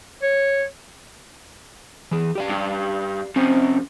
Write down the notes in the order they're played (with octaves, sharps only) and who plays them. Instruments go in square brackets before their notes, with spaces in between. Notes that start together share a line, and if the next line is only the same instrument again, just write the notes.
[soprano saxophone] C#5
[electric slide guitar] E3 G#4
G4 D5 F5
[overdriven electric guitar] G2
[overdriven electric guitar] F2 C3 [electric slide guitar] C#4